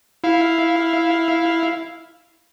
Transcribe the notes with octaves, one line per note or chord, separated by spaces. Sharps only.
E4 F5